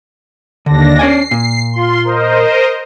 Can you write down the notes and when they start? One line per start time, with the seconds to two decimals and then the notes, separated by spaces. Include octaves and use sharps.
0.66 D#2 D3 D4 A#6
0.99 C#4 D5 G#5 C7
1.31 A#2
1.73 F4 C6
2.04 A#4 C5 D#5